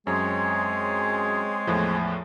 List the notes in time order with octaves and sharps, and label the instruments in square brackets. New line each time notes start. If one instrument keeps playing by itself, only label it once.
[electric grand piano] F#2 [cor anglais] G#3 [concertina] C4 G#4 C#5
[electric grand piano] E2 A2 F3